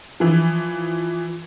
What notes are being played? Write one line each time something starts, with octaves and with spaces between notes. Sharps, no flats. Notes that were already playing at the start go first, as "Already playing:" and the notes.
E3 F3